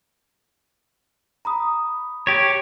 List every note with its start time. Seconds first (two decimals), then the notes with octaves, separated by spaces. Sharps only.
1.45 A#5 B5 D#6
2.27 G4 C#5